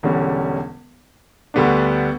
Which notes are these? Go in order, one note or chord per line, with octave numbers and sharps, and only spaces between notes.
E1 E2 D3 G3 C#4
D2 D3 G3 B3 D4